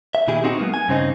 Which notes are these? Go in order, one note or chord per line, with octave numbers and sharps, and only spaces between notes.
E5
A#2 D#3 E4 G4 G#4
C4 D#4 F#4 G4
F#3 G#3 A#3 B3
G#5
G2 C#3 C4 D4 D#4